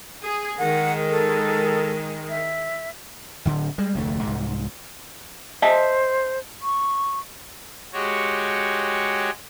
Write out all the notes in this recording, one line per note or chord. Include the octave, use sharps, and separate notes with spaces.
G#4
D#3 G#3 F#5
A4
E5
D1 D3
G3 G#3
F1 D2 A3
C2 G#2
C5 D#5 E5 A5
C#6
G#3 F#4 G4 C#5